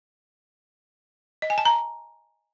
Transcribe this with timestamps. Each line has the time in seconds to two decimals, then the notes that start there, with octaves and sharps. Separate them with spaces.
1.42 D#5
1.50 G#5
1.58 A5
1.65 A#5